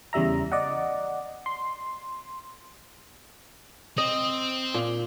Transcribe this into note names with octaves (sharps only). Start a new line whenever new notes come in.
E2 C#3 G3 E5 A#5
D5 D#5 F#5
C6
C4 D#5
A#2